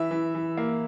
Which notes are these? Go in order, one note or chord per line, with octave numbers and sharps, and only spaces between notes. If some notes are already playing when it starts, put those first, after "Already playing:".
Already playing: E3 E5
E3
E3
A#3